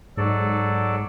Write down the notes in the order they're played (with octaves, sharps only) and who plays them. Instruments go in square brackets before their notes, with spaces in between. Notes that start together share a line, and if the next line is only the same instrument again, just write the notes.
[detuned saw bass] G#2 [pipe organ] F#3 A4 D5